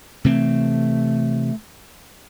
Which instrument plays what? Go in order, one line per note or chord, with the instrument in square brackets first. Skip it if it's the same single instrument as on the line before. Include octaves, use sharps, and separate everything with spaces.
[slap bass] C3 E3 C4 [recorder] A3